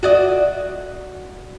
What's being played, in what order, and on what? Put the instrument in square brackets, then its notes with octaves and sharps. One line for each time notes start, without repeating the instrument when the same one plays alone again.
[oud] F#4 D5 D#5